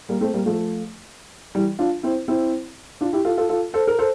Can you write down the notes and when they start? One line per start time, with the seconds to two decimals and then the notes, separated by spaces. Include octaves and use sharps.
0.09 G3 A#3
0.21 A3 C4
0.34 G3 A#3
0.46 F3 A3
1.55 E3 G3
1.79 D4 F4
2.03 C4 E4
2.28 C4 E4
3.01 D4 F4
3.13 E4 G4
3.25 F4 A4
3.37 F4 A4
3.49 F4 A4
3.74 A4 C5
3.87 A#4
3.99 A4 C5